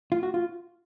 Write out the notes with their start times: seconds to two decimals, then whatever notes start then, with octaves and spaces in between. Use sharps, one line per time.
0.12 F4
0.23 F#4
0.34 F4